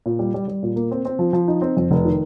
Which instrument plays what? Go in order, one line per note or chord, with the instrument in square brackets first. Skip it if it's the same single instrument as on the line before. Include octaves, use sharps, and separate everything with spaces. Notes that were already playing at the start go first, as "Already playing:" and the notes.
[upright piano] A#2
G3
G3
G3
A#2
A#3
C4
C4
F3
F3
D#4
C4
F2
F1
D#3